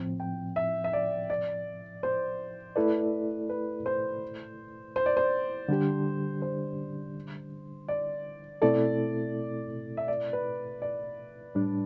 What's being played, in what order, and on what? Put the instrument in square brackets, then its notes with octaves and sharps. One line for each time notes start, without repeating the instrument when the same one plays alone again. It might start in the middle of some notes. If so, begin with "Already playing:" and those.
Already playing: [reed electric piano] A2 F3 C4
[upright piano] G5
E5
E5
D5
D5
C5
[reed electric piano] A3 E4 A4 D5 [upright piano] B4
[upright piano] B4
C5
C5
D5
C5
[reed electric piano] D3 G3 D4 G4
[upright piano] C5
D5
[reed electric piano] B2 A3 C4 E4 A4 [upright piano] D5
[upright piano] E5
D5
B4
D5
[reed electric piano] A2 G3 D4